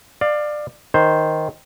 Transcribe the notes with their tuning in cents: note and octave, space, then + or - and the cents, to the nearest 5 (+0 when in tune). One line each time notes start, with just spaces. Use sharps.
D5 +20 F5 +0
D#3 +5 C5 +0